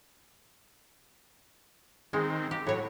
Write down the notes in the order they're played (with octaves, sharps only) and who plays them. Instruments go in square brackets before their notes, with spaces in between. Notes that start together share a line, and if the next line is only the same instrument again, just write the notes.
[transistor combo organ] D#3 C4 [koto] G#3
[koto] G4
[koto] A2 C#5 [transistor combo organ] F#3